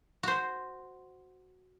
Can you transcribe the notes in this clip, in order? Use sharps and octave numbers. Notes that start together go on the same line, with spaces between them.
F#4 C5